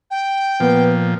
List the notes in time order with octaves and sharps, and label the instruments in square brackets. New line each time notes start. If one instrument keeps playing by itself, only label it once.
[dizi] G5
[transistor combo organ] A#2 F3 [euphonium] B3